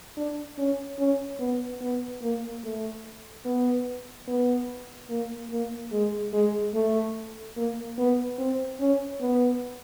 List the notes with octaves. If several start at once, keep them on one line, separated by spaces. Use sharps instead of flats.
D4
C#4
C#4
B3
B3
A#3
A3
B3
B3
A#3
A#3
G#3
G#3
A3
A#3
B3
C4
C#4
B3